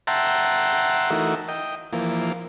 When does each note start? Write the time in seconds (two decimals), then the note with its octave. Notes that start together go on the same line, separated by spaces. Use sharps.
0.07 E5 F#5 G5 A5 A#5 C6
1.10 E3 A3 D#4 F#4 A#4 E5
1.48 D#5 G5
1.93 E3 F3 A#3